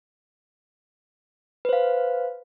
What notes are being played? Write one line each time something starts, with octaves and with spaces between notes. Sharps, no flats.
B4 C5 F5